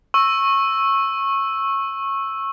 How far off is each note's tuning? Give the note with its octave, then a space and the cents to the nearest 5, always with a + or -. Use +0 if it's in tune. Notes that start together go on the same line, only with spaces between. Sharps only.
C#6 -20 E6 +0